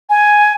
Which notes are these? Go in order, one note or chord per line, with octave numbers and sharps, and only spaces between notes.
G#5